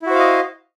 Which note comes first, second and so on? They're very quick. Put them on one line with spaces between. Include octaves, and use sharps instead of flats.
E4 F#4 C5 F5 D#5